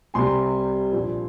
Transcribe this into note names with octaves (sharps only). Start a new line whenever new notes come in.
C2 C3 G3 G#5 C6
A#1 A#2 F3